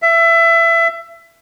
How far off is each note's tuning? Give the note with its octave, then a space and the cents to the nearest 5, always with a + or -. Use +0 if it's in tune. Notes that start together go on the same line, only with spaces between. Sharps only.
E5 +25